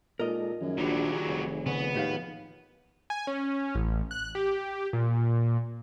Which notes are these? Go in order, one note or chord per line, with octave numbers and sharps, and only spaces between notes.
A#2 G#3 D#4 A4 A#4 D#5
F#2 D#3 F3 G#4
A#1 F#3 G3
F1
C#3 B3
D#2 A2 G4 F5
G#5
C#4
A1
F#6
G4
A#2